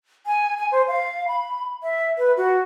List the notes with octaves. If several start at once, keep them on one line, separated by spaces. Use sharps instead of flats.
G#5
G#5
C5
F5
B5
E5
B4
F#4